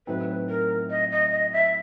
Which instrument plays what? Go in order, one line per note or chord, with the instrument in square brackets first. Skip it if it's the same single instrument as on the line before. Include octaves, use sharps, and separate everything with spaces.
[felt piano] A2 F#3 A3 C4 D#4 [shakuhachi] B4
[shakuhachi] A#4
D#5
D#5
D#5
E5